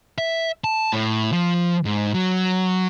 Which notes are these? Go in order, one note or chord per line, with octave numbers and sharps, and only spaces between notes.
E5
A5
A2
F3
G#2
F#3